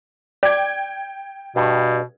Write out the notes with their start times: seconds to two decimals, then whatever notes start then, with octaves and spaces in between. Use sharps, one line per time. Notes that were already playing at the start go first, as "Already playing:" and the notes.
0.43 D5 G5 G#6
1.56 G2 B2